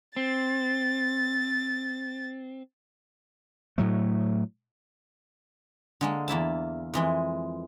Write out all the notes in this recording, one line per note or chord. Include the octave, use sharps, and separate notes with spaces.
C4 A6
A2 F#3 A3
D3 G#3 A#3
E2 A#3 E4 A5
F2 E3 G#3